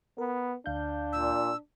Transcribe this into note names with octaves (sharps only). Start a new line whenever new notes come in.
B3 A#4
D2 D4 F5 G6
A#2 E6